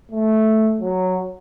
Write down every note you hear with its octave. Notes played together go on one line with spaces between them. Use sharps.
A3
F#3